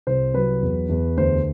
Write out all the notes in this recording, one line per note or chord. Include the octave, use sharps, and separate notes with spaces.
C2 C5
F#3 B4
E2
E2
D2 C5